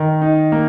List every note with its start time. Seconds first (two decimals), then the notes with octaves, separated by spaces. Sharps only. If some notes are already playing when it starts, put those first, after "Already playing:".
Already playing: D#3
0.21 D#4
0.52 A#3